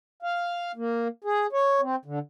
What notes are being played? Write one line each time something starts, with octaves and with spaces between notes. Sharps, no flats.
F5
A#3
G#4
C#5
C4
D3